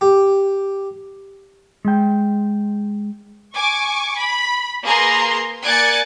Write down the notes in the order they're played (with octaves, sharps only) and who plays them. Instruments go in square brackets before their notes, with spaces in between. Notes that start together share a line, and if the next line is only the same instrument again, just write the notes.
[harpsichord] G4
[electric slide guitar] G#3 G5
[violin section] G#5 C#6 D6
B5
A#3 G#4 B4 A#5 C6
A#3 D5 G#5 F#6 A6 C#7